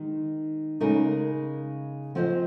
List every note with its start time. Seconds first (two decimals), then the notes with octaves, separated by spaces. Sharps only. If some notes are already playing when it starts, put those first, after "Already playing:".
Already playing: D#3 G#3 D#4
0.80 C#3 G#3 D#4 A#4
2.15 F3 C4 F4 C5 D#5